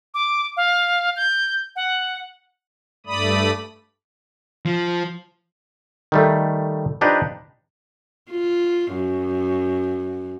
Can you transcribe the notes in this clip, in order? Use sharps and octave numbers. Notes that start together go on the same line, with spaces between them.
D6
F5
G6
F#5
G2 A3 D5 B5 D#6
F3
D#3 G3 A3
F3 D4 D#4 G4 B4
F4
F#2